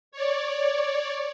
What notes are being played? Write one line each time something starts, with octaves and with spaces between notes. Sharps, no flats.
C#5 D5